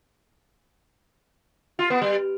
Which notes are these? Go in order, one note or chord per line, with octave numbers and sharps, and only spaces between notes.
F4
B3
G3